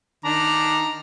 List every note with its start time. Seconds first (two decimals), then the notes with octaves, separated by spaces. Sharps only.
0.25 D#3 D4 A#5